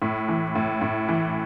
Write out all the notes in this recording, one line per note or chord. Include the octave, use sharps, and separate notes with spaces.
A2
E3
A2
A2
E3